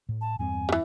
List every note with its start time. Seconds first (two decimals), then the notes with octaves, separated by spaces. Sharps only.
0.09 A2
0.21 A5
0.39 E2 G2 C4 G#5
0.69 C#3 E3